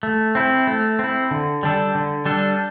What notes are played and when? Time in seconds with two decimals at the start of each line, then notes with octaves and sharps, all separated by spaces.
0.03 A3
0.35 C4 E4
0.67 A3
0.99 C4 E4
1.31 D3
1.63 G3 D4 A4
1.95 D3
2.25 G3 D4 A4